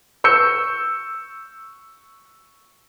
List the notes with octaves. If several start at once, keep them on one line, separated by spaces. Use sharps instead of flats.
C#6 E6 G6 C#7